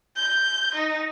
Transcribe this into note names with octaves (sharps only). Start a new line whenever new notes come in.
G6
D#4